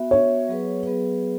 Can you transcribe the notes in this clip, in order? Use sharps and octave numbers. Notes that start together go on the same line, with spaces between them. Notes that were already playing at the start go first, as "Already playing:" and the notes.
Already playing: B3 F#4 E5
B3 F#4 C#5 E5
F#3 B3 G#4 B4
F#3 B3 G#4 B4